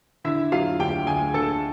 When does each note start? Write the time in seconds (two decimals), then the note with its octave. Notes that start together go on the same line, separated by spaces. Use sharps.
0.24 D3 E4 E5
0.52 F#3 F4 F5
0.79 D2 G4 G5
1.07 D2 G#4 G#5
1.34 D3 A4 A5